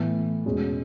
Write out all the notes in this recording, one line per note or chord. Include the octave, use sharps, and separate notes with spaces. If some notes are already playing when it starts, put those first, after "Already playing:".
Already playing: A2 E3 B3
E2 B2 G#3 C#4